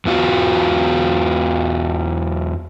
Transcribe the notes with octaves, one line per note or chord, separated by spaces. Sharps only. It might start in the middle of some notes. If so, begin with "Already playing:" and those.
E2 B3 F4 F#4